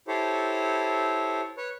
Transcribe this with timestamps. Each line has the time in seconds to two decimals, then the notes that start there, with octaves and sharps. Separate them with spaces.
0.08 E4 G4 A4 C5 C#5
1.57 B4 C#5